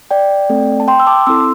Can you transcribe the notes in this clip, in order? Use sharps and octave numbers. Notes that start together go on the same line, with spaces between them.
D5 G5
A3 C4 A4
A5
G5 C6
E6
A5 D6
C4 E4 A4 C6 E6